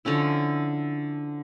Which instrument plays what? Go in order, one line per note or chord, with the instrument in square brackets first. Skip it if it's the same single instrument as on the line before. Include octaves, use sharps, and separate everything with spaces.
[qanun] D3 F3 C#4 E4